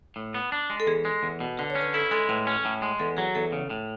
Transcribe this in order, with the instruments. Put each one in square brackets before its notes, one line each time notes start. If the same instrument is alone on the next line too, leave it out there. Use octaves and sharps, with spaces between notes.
[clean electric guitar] A2
B3
D4
G#3
[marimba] A4
[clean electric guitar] E2 [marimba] G#4
[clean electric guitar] G#3
E2
B2
[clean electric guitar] D3 [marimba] B4
[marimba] C#5
[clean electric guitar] C#4
[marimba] B4
[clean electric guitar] E4 [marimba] A4
[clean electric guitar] G#3 [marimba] A4
[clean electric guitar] A2 [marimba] B4
[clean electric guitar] C#4
A2
G#3
[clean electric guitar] E2 [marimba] A4
[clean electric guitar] F#3 [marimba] G#4
[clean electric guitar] E2 [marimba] A4
[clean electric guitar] C#3
A2